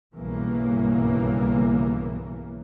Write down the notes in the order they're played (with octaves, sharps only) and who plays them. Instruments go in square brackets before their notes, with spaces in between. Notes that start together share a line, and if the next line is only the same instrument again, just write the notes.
[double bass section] B1 G2 C#3 E3 A#3 B3